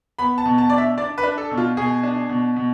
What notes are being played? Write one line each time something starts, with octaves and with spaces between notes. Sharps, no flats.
B3 B5
A5
B2
A5
D4 D5
E5
D4 D5
B4
D4
A4
B2
F4
B2 G#4
D4
B2
B2